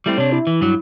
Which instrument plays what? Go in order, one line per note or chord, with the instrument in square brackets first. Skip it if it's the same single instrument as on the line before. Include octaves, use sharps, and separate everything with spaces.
[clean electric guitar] G3 A3 C4 [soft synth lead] E4
[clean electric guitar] C3 D4 [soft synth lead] C#5
[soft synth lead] E4
[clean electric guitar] E3
G2 F#3